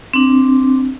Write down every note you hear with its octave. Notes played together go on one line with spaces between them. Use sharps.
C4 D4